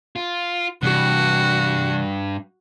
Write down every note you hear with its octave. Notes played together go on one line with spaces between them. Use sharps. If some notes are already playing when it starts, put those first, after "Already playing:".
F4
G2 C3 E3 F#4